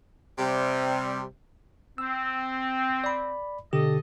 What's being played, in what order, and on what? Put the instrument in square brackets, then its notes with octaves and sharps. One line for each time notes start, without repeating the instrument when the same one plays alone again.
[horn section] C3 G3
[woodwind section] C4 [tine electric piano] E6
[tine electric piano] D5 B5
[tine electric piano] B2 D3 G4 [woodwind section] A4 D#5